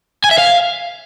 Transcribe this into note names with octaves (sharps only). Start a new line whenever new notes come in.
G#5
E5
F5